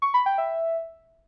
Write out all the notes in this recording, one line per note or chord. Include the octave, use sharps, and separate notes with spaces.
C#6
B5
G5
E5